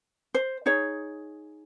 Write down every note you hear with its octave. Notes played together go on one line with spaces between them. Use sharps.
C5
D#4 G#4 C#5